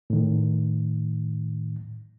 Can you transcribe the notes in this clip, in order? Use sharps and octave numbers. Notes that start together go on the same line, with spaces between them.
A2 D#3